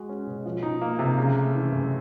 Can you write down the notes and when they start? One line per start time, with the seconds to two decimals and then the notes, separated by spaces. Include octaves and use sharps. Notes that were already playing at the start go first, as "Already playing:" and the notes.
Already playing: G#3 F#4
0.09 C#4
0.27 B2
0.45 F3
0.63 D#4
0.81 A#3
0.99 C3
1.18 C#3
1.36 A3
1.55 E3
1.72 F#2